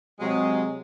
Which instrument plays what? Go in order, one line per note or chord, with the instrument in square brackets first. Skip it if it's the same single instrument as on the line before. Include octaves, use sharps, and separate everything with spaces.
[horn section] C3 F#3 G#3